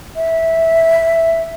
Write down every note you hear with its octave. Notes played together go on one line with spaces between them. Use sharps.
E5